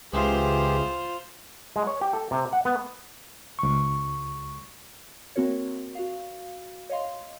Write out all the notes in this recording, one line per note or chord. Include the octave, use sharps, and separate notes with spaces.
C#2 E3 F4 G4 G#4 C5
G#3
C#5
G4
A4
C3
F#5
B3
C#2 C#6
A#3 C4 F#4 A#4 C#5
F#4 F5
C#5 D#5 F5 C6